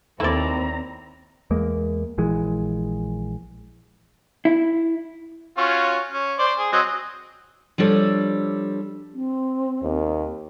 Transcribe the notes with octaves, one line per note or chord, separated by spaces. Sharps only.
D#2 A3 C4 E4 C5 D5 A#5
E2 G#3 A#3
A#1 E3 G#3
E4
C#4 F4 F#4
C#4
C5 D5
G#4
F#3 C4 D#5
F3 G3 D4 A4 C#5
C4
D#2